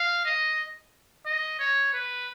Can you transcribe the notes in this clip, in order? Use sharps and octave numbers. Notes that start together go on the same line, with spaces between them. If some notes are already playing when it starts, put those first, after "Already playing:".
Already playing: F5
D#5
D#5
C#5
B4